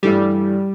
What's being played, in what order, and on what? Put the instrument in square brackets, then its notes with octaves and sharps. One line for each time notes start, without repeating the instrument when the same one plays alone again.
[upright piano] G2 E3 A3 [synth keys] G3